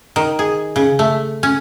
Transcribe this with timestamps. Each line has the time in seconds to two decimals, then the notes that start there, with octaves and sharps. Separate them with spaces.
0.16 D#3
0.39 G#4
0.76 C#3
0.99 A3
1.43 C#4